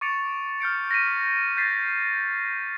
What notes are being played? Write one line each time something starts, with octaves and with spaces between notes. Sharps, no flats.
C#6 D6 A6 C#7 D7 F7
F6 G6 C#7 D7
A#6 B6 D#7
G6 A6 B6 C7